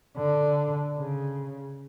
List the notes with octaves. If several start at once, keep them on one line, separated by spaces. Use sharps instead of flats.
D3
C#3